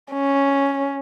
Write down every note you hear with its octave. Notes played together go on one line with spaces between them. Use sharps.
C#4